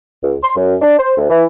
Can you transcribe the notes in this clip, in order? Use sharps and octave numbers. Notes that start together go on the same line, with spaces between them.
C#2
C6
F#2
D4
C5
D2
E3